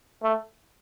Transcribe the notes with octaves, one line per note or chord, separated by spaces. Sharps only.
A3